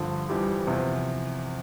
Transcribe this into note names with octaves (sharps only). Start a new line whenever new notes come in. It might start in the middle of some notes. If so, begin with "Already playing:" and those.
Already playing: G2 D3 F3
F2 E3 G3 C4 G4
E2 C3 F3